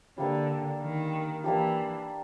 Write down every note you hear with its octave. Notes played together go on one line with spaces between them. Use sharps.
D3 G3 A#3 D4
D#3
E3 A#3 D4 G4